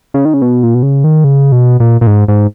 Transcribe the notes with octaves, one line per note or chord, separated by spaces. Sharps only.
C#3
D#3
C#3
B2
A#2
B2
C#3
D#3
C#3
B2
A#2
A#2
G#2
G#2